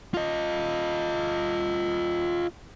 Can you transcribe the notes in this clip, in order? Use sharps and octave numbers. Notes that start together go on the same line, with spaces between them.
F4 D#5